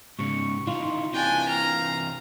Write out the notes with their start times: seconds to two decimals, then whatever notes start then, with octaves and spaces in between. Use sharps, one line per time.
0.19 G#2 C#3 C#6
0.67 D#3 E3 F4
1.14 C3 E3 D4 G5 G#5
1.49 F5 A#5